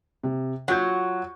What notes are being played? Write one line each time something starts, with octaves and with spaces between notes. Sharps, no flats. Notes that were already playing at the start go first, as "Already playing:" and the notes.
C3
F#3 F4 F#4 G6